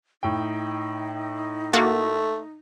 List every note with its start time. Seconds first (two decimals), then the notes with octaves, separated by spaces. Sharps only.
0.23 A2 D#4 G5
1.73 A3 A#3 F#4 A6